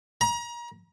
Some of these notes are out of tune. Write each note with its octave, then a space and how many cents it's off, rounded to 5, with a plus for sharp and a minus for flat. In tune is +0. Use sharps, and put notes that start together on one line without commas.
A#5 +35